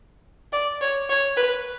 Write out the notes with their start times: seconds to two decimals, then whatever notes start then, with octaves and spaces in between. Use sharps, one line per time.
0.53 D5
0.81 C#5
1.09 C#5
1.37 B4